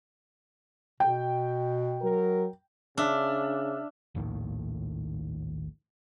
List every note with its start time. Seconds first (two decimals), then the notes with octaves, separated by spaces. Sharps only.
1.00 B2 G5
2.02 F#3 A#4
2.97 C#3 D4 E5 E6 F6
4.15 A#1 D#2 A2 D#3